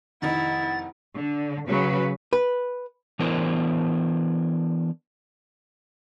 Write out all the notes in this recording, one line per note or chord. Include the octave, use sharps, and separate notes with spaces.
F1 D#3 D#4 E4 F#5 A6
D3
C#3 F#3 B4
B4
E3 B3 D4 E4 A#4 C5